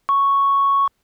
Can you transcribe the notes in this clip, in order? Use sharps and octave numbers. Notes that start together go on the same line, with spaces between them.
C#6